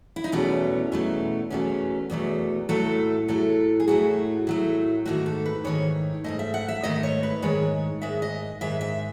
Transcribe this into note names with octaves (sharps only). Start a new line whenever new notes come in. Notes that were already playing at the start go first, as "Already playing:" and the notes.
E4
D#4
E2 B2 F#3 A3 C#4
E2 B2 F#3 A3
E2 B2 F#3 A3 C#4
E2 B2 F#3 A3
A2 F#3 A3 A4
A2 F#3 A3 A4
G#4
A2 F#3 A3 F#4
A2 F#3 A3
G#2 D#3 A3 F#4
A4
B4
G#2 D#3 A3 C#5
G#2 D#3 A3 D#5
E5
F#5
E5
G#2 D#3 A3 D#5
C#5
B4
G#2 D#3 G#3 C#5
G#2 D#3 G#3 E5
D#5
G#2 D#3 G#3 E5
E5